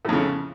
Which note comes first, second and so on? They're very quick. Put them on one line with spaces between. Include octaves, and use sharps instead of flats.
A2 F2 C#3